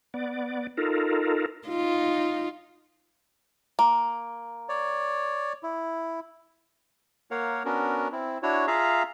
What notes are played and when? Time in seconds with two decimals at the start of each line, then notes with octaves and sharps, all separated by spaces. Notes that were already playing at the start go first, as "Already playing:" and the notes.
0.14 B3 D5
0.77 D#4 F4 A4 A#4
1.68 D#4 F4
3.79 A#3
4.69 C#5 D5
5.63 E4
7.31 A#3 A#4 C#5 F5 F#5
7.65 B3 C#4 D4 F#4 A#4
8.12 C4 E4
8.43 D4 E4 F#4 C#5
8.67 F4 G#4 E5 F5 A#5